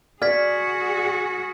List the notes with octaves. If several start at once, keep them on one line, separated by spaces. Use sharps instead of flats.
F#4 G#4 D5 F6 G#6 B6